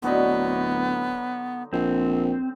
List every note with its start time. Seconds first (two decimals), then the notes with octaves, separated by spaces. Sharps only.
0.02 D1 D3 F#3 B3 D#4
1.73 A#1 C4